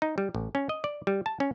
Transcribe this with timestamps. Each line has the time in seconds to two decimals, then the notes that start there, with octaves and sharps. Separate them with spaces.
0.02 D#4
0.18 G3
0.35 A1
0.55 C#4
0.69 D#5
0.84 D5
1.07 G3
1.26 A5
1.40 C#4